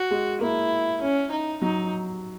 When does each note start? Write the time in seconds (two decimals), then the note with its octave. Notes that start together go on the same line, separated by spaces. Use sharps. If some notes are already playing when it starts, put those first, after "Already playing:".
Already playing: F#4
0.11 G#3
0.41 A#3 E4
1.02 C#4
1.31 D#4
1.62 F#3 D#4